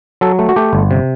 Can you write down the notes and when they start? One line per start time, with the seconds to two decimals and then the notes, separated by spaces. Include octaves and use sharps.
0.21 F#3 A4
0.39 A3
0.49 F#4
0.56 A3 G4
0.73 G1
0.91 C3